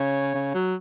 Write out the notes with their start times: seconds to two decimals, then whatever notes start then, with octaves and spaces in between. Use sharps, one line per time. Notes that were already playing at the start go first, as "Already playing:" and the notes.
Already playing: C#3 C#5
0.34 C#3
0.54 F#3